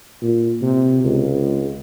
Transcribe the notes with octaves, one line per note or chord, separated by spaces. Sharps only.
A#2
C3
C#2